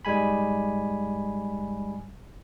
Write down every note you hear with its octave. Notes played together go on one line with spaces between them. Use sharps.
G#2 G3 G#3 G#5 B5